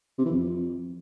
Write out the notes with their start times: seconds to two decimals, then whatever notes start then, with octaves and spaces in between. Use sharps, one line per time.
0.18 C3
0.25 E3
0.32 F2